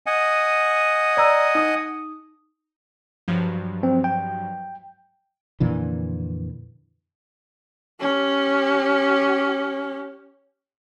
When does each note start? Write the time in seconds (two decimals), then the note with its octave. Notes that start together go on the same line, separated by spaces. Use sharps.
0.06 D#5 F#5 G#5
1.17 D5 A#5 E6
1.55 D#4 D#6
3.28 G2 F3 F#3
3.83 C4
4.04 G5
5.60 F2 A#2 D3 E3
8.00 C#4 G4